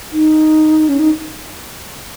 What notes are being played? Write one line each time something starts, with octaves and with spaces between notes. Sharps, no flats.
D#4
C#4
D#4